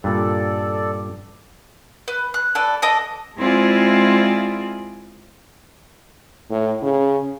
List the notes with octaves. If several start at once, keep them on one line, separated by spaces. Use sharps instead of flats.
G2 A#2 A4 D5
B4
F#6
A4 B4 D5
A4 D#5 D6
G#3 C4 E4 F4 G#4 D5
A2
C#3